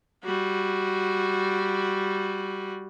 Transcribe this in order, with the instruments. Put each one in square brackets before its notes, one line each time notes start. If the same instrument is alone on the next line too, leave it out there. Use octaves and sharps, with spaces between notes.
[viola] G3 F#4